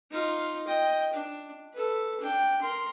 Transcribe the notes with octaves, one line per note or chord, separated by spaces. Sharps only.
D#4 F4
D#5 G5
D4
A4 B4
D4 G5
A#4 C6